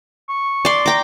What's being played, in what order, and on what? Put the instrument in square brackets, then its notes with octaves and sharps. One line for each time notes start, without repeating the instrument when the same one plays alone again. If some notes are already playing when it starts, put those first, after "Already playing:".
[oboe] C#6
[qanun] D5 C6
[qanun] G5 D6 [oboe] A#5